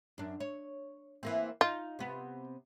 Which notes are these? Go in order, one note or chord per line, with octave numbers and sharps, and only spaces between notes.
F#2 D4
C#5
E3 A#3 C4
D#4 F4
C3 B3